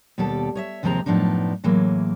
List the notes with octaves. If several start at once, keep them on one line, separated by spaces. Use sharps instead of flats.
D#2 B2 G3 G4 A4
C#5 D#5 E5
D#2 C3 F3 G#3 C4 A#5
F#2 A2 F3 B3 D4 D#4
A2 E3 F#3 G#3 A#3